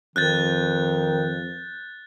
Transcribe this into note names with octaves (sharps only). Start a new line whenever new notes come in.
F2 D#3 F#6 G6 A6